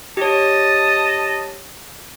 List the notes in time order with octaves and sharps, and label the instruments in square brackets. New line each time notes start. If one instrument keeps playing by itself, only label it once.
[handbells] G4 C#5 [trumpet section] D#5 A5